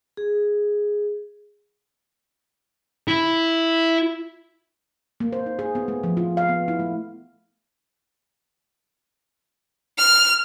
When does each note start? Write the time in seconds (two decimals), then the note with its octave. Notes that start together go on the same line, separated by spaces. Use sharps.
0.17 G#4
3.08 E4
5.20 A#3
5.33 C5
5.46 D#4
5.59 G#4
5.75 B3
5.88 A3
6.04 F3
6.17 F4
6.37 F5
6.49 B3
6.68 E4
6.79 A3
9.98 F6